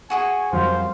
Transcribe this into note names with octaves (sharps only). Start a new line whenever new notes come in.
F#4 G#4 G#5 C#6
F2 F#3 G3 C5 F5